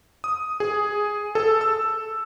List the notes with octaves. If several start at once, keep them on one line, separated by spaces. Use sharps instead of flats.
D#6
G#4
A4
E6